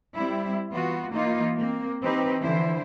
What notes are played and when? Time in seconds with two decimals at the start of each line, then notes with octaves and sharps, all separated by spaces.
0.15 G3 C4 E4
0.71 E3 B3 F4 F#4
1.10 E3 A#3 D#4 F4
1.58 A#3 C4
2.01 E3 C4 D#4 G4 B4
2.42 D3 E3 F3 E4 C5